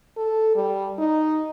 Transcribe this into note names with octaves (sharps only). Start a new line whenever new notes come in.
A4
G3
D#4